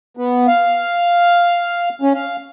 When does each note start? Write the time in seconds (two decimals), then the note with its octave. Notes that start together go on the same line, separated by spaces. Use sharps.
0.17 B3
0.48 F5
2.02 C#4
2.14 F5